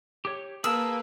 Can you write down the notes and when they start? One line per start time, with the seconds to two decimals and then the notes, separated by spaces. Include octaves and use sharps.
0.25 G4 C#5
0.64 A#3 G#4 A#4 B4 A5 E6